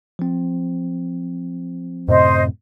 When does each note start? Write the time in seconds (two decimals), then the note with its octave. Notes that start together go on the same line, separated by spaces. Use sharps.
0.19 F3 C4
2.08 F#2 A2 C3 C5 D#5